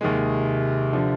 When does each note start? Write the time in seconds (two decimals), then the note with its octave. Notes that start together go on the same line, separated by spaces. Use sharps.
0.01 D#2 C3 D#3 G#3
0.93 D3 F3